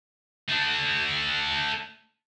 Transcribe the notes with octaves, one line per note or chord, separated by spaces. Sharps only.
A3 D4